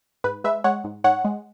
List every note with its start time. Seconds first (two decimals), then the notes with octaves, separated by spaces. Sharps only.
0.24 G#2 B4
0.44 G#3 B4 E5
0.64 G#3 C#5 F#5
0.84 G#2
1.04 G#2 C#5 F#5
1.25 G#3